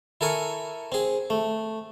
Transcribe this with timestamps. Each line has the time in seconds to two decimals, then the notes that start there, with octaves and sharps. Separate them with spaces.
0.21 E4 A4 A#4 G#5 C#6
0.92 C4 G#4
1.30 A3